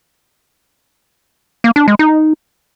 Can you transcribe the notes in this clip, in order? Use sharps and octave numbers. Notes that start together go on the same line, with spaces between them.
A#3
D4
G#3
D#4